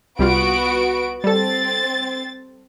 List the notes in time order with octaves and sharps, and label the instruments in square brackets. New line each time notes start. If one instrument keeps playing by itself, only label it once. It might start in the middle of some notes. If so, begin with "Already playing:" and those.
[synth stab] C2 G3 F4 [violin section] B3 F#4 D7
[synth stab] G3 A4 [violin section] C4 A6